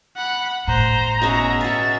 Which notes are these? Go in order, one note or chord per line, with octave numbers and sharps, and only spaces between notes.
F#5 B5
G1 A2 C5 A#5
B2 C#4 F#4 G#4 E5
F#4 F5 A6